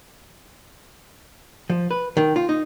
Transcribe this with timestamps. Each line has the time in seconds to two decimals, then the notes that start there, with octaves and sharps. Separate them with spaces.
1.70 F3
1.91 B4
2.17 D#3
2.36 F4
2.49 D#4